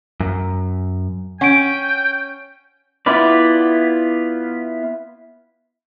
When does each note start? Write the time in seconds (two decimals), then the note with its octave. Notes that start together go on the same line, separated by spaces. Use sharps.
0.20 F#2
1.41 C#4 F#5 G5 C#6 D7
3.06 B3 E4 F4 B4 D5